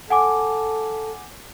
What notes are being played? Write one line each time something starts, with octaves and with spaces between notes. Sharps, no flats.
A4 F#5 G#5 D6